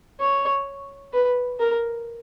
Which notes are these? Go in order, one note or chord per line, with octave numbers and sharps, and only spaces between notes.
C#5
B4
A#4